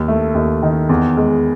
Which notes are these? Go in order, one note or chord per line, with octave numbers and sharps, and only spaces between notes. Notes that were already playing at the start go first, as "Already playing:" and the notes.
Already playing: D#2
A3
D#2
D#3
E2
G#3